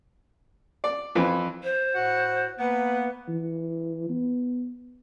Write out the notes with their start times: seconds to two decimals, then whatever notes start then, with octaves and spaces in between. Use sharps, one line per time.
0.84 D5
1.15 F2 E3
1.63 C5
1.95 A2 F#4 F#5
2.59 A#3 B3 B4 F#5
3.28 E3
4.10 B3